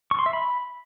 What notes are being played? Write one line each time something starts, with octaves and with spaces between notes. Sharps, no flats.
C#6
C6
E5
B5